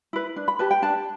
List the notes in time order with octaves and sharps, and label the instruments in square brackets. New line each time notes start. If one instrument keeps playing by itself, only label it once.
[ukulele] E4 B4
D4
B5
G4 B4 A5
G5
D4 A5